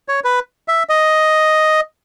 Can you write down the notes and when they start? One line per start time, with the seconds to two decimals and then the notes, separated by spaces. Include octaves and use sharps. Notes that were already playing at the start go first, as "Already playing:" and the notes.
0.08 C#5
0.24 B4
0.68 E5
0.89 D#5